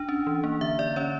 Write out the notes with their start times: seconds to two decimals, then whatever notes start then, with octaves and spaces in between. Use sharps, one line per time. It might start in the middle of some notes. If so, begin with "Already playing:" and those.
Already playing: D4
0.09 C#4
0.27 E3
0.44 A#3
0.61 D3 E5
0.79 D3 D5
0.96 C#4 C#5